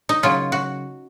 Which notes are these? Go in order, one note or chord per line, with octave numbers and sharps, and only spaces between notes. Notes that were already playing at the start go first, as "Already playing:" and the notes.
D#4
C#3 F#3 A#3 F4
F#4